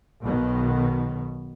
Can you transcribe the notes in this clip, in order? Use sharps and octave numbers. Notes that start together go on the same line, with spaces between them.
B1 B2 D#3